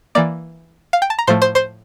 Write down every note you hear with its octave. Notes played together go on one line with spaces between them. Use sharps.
E3 A#3 D5 D6
F5
G5
A5
A#5
A2 F3 A3 C5 C6
C5 C6
C5 C6